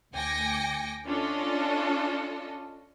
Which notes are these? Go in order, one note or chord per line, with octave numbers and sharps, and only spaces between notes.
D2 G5 G#5 D6 A#6 C#7
C#4 D4 F4 A4 D#5